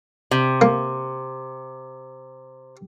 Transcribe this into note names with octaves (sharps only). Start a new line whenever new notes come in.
C3
A#3